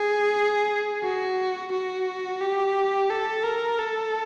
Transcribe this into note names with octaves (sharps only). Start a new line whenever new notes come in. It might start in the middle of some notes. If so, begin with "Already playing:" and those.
Already playing: G#4
F#4
F#4
G4
A4
A#4
A4